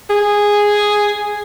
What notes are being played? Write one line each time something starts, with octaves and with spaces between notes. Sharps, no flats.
G#4